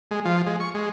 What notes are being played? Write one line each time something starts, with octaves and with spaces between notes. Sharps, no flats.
G#3
F3
G#3
C#6
G#3